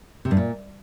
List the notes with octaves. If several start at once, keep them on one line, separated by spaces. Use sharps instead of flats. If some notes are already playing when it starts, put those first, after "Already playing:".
C3
G2
A#2